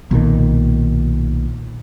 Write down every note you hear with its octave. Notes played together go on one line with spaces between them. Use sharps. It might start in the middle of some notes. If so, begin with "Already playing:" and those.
B1 A#2 D3 D#3